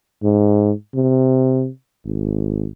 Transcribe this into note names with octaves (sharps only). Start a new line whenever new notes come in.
G#2
C3
G#1